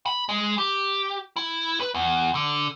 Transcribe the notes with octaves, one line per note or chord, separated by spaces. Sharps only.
B5
G#3
G4
E4
B4
E2
D3